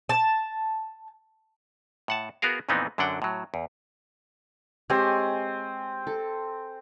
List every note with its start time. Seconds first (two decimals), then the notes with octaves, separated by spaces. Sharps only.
0.09 A5
2.08 A2 F#5 A5
2.42 B3 F#4 G#4 A#4 F5
2.69 F2 A#2 E3 B3 C4 D#4
2.98 F#2 D3 F#3 D4 F#5 G5
3.22 A2 F#3
3.54 E2
4.90 G#3 C4 G4 C#5 G#5
6.07 A4